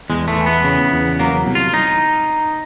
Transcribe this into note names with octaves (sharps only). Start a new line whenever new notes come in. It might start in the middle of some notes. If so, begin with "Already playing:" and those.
E2 G#3
A3
E3
B3
C#3
E2
F#3 A#3
C2
F4
D#4